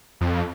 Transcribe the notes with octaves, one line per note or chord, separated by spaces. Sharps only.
F2